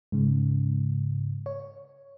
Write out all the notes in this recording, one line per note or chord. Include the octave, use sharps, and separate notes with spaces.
G#2 C#3
C#5